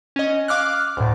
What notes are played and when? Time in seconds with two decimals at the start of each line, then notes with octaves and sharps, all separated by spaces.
0.16 C#4 D#5
0.48 F5 D6 F6 F#6
0.97 D2 A2